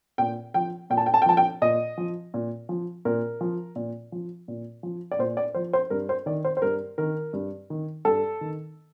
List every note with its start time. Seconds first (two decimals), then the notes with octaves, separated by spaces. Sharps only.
0.18 A#2 G5
0.54 F3 G5
0.90 A#2 G5
0.97 A5
1.06 G5
1.14 A5
1.22 G5
1.26 F3 A5
1.37 G5
1.62 A#2 D#5
1.98 F3
2.34 A#2
2.69 F3
3.05 A#2 A#4
3.41 F3
3.76 A#2
4.12 F3
4.48 A#2
4.83 F3
5.11 D5
5.19 A#2 C5
5.37 D5
5.54 F3 C5
5.73 C5
5.90 G2 A#4
6.09 C5
6.26 D#3 D5
6.45 C5
6.57 C5
6.62 G2 A#4
6.98 D#3 A#4
7.33 G2
7.70 D#3
8.05 G2 A4
8.41 D#3